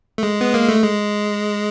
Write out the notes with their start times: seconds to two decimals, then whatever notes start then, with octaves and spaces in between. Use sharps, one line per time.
0.18 A3
0.23 G#3
0.41 B3
0.54 A#3
0.69 A3
0.83 G#3